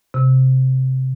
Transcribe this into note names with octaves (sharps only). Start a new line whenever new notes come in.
C3